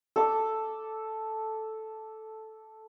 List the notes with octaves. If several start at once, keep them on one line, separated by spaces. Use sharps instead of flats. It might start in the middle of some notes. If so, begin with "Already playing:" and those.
A4 D6